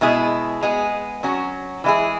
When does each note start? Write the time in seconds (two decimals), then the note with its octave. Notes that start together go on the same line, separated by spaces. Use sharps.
0.01 B2 G#3 E4 G#4
0.63 G#3 B3 G#4
1.23 F#3 C#4 F#4
1.84 E3 G#3 E4 G#4